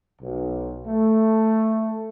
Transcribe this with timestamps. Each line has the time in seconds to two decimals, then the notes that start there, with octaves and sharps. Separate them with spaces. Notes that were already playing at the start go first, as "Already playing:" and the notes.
0.22 B1
0.86 A3